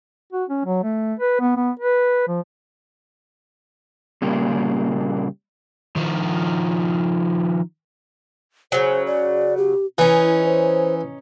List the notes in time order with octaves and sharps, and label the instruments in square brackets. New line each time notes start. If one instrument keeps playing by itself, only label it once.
[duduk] F#4
C#4
F#3
A3
B4
B3
B3
B4
F3
[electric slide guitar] A#2 C#3 G3 A#3
[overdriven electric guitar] D#3 F3
[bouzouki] C#3 F#3 [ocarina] C5
[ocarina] D5
G4
[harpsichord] E3 [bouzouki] C#4 D#4 [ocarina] E4
[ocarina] C5